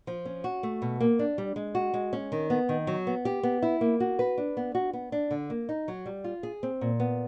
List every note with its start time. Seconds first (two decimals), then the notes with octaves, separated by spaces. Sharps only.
0.07 F3
0.25 C#4
0.44 F#4
0.63 A3
0.82 B2
1.00 A#3
1.19 D4
1.38 G3
1.56 G#3
1.75 F#4
1.94 G#3
2.13 C#4
2.32 D#3
2.50 B3
2.69 D#3
2.87 F#3
3.07 B3
3.25 G4
3.43 B3
3.62 E4
3.81 A#3
4.00 F#4
4.19 B4
4.38 D4
4.57 B3
4.75 F#4
4.93 B3
5.12 D4
5.31 D3
5.50 A#3
5.69 D#4
5.88 F#3
6.06 G3
6.24 F4
6.43 G#4
6.63 C4
6.81 A#2
7.00 B3